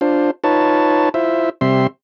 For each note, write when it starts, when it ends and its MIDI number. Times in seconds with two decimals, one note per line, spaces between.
0.01 0.31 62
0.01 0.31 65
0.01 0.31 72
0.44 1.09 63
0.44 1.09 65
0.44 1.09 71
0.44 1.09 73
0.44 1.09 81
1.14 1.50 64
1.14 1.50 65
1.14 1.50 72
1.14 1.50 76
1.61 1.87 48
1.61 1.87 55
1.61 1.87 60
1.61 1.87 76
1.61 1.87 84